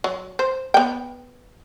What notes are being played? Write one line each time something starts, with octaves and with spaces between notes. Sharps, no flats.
F#3
C5
B3 G5